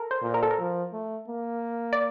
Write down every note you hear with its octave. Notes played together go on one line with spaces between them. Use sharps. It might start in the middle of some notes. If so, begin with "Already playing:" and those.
Already playing: A4 A#4
C5
A#2
A#4
A4
A#4
F3
A3
A#3
D5